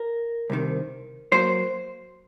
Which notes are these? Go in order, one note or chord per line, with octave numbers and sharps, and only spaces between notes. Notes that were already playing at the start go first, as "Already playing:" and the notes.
Already playing: A#4
C2 C3 D#3
F#3 A#3 C5